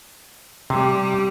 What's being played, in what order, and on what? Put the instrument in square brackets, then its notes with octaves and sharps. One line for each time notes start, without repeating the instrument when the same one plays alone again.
[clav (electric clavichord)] C3 [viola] G3